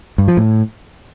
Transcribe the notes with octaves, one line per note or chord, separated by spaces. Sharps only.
G2
F3
A2